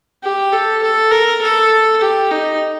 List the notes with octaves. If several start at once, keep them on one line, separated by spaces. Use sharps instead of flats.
G4
A4
A4
A#4
A4
G4
D#4